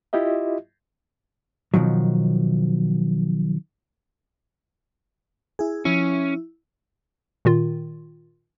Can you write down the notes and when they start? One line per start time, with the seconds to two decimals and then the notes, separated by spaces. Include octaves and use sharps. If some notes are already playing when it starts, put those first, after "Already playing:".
0.13 E4 F4 G4 D#5 E5
1.74 B2 D#3 F3 F#3
5.59 E4 G#4
5.85 F3 C#4 E4
7.45 A#2 D#3 F4